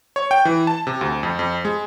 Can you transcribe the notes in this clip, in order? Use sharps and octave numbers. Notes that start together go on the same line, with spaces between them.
C#5
G5
E3
A5
C3
D2
F2
F2
G#3